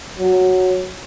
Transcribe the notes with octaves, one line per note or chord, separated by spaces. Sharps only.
F#3